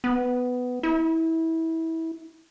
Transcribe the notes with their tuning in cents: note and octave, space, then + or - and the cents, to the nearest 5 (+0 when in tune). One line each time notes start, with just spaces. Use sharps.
B3 +10
E4 -25